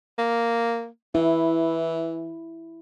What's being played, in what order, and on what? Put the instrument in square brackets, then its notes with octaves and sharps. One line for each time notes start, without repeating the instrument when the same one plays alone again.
[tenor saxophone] A#3
[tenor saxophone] E3 [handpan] E4